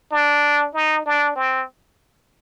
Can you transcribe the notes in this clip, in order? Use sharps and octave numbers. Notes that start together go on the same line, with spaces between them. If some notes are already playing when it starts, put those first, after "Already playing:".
D4
D#4
D4
C4